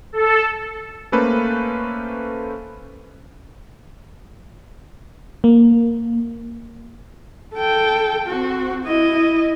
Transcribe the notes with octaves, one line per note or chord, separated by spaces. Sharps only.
A4
A3 A#3 C#4 A4 B4 C5
A#3
A4 G5
C4 F#4
E4 D#5